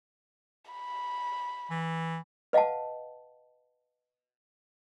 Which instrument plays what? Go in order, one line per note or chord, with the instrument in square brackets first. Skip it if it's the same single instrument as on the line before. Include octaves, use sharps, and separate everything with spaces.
[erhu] B5
[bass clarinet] E3
[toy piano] B4 D#5 F5 F#5 A5